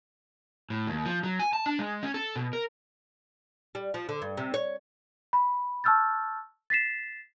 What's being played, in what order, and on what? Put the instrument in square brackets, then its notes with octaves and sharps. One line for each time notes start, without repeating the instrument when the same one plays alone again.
[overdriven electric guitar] A2
D#2
F3
F#3
G#5
A5
D4
G#3
C#4
A4
B2
A#4
[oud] G3
F3
D3
G2
C3
C#5
[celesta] B5
A5 C#6 E6 F6 G6 A6
A6 B6 C7 E7